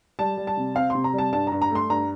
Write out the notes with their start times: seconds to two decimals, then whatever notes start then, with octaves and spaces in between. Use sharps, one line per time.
0.19 G3 A5
0.37 G3
0.47 A5
0.57 C3
0.75 C4 F5
0.90 C3 C6
1.04 A#5
1.13 G3 A5
1.32 G2 A5
1.47 G2 A#5
1.62 A#5
1.71 A3 C6
1.90 G2 A#5